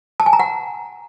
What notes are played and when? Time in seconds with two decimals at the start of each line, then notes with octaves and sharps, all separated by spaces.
0.20 A5
0.26 G#5
0.33 A#5
0.40 F#5